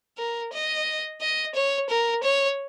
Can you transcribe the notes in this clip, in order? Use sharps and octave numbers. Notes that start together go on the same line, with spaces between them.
A#4
D#5
D#5
C#5
A#4
C#5